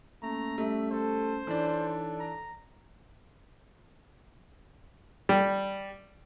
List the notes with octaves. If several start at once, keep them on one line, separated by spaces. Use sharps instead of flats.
A3 A#3 C#4 A#5
G3 A3 C#4 E5
A4 C5
E3 D4 D#4 A4 C#5 D5
A#5
G3